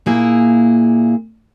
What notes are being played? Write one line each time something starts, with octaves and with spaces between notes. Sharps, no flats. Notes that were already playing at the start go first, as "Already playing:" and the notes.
A#2 A#3 E4 G#4